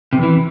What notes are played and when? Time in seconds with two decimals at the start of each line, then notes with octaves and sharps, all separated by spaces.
0.13 C3
0.18 E2
0.23 E3